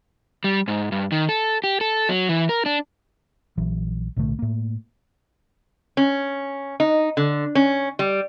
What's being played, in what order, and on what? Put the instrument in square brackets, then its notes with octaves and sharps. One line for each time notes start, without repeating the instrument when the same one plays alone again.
[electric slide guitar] G3
G#2
G2
D#3
A4
G4
A4
F#3
E3
A#4
D4
[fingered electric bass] A#1 E3 F#3
B1 A2 D3 A3
A2 A#3
[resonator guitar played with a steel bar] C#4
D#4
D3
C#4
G3